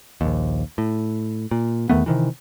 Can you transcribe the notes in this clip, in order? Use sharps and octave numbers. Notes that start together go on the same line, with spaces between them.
A#1 D#2
A2
A#2
E2 D#3 A3 B3
C3 D#3 E3